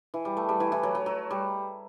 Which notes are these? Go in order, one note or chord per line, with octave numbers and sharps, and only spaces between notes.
E3
G3
A3
G3
E3
E3
F#3
F#3
F#3
G3